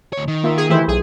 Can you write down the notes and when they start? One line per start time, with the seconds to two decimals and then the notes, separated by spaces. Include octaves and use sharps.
0.13 D2 C#5
0.28 D#3
0.44 A#3 F4 E5
0.57 G#4
0.70 E3 A3 E4 G4 C5
0.87 B1 G#4